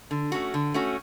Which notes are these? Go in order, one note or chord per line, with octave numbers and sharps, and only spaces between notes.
D3
A3 C#4 F#4
D3
A3 C#4 F#4